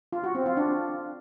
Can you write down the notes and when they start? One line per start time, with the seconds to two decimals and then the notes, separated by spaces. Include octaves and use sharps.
0.13 F4
0.24 F#4
0.35 C4
0.46 F4
0.57 D4